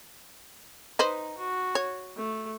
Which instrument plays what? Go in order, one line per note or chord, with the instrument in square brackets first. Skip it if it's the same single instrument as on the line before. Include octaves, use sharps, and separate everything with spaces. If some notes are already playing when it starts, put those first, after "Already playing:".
[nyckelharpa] D#4 [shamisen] B4 C5 D#5
[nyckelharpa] F#4
[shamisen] C#5
[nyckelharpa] A3